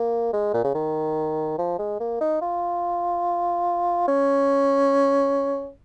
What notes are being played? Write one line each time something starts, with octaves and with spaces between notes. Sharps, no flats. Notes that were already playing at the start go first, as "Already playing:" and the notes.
Already playing: A#3
G#3
A#2
C#3
D#3
F3
G#3
A#3
D#4
F4
C#4